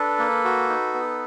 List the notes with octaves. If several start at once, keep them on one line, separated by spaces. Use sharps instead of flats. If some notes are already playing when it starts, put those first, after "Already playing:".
Already playing: D4 A4 B4
A#3
F#4
D#4
B3